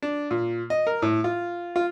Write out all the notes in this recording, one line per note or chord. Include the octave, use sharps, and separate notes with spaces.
D4
A#2
D#5
A#4
A2
F4
F4